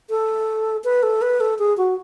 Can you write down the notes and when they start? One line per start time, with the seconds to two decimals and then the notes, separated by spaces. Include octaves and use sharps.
0.10 A4
0.84 B4
1.03 A4
1.22 B4
1.40 A4
1.59 G#4
1.78 F#4